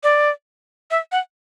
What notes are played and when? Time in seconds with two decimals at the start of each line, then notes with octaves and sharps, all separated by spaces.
0.03 D5
0.91 E5
1.12 F#5